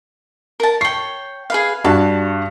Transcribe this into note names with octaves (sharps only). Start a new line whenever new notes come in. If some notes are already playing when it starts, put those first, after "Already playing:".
A#4 A5
C#5 G5 C7
G#4 B4 F5
G2 F#4 A5